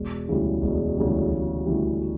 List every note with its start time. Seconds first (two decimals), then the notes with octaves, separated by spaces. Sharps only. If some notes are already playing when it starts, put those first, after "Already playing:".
Already playing: E1
0.28 D2 C#3 E3 G3
0.62 E1
0.97 D2 C#3 E3 G3
1.30 E1
1.65 D2 C#3 E3 G3